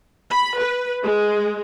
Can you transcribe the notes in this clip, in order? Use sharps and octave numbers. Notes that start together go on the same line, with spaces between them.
B5
B4
G#3